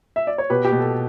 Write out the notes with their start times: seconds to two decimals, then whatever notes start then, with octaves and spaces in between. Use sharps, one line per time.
0.16 E5
0.27 D5
0.38 C#5
0.50 B2 G4 B4
0.65 G4
0.72 B2
0.80 A4